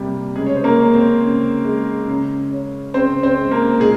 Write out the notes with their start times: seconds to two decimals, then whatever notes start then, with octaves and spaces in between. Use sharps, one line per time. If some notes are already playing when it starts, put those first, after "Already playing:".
Already playing: C3 G3 A#3
0.35 C#3 G#3 G#4
0.46 C#5
0.56 C5
0.64 A#3 A#4
0.79 C#4
0.93 C4 C5
1.22 C#3
1.65 G#3
2.08 C#3
2.51 C#4
2.94 C#3 C4 C5
3.23 C4 C5
3.38 G#3
3.51 A#3 A#4
3.80 A#2 G#3 G#4